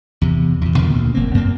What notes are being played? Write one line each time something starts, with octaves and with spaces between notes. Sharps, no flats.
E2 C3
E2 A#2
B2 D3 D#3 F3
D2 A#2
F#1 A#3 C4
F#2 A#3 C4